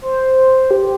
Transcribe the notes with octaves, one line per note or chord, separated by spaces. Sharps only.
C5
G4